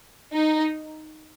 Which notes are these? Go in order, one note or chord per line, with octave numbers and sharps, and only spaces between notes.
D#4